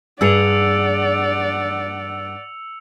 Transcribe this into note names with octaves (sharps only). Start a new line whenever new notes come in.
G2 G#4 D5 F#5 E6 C#7 F7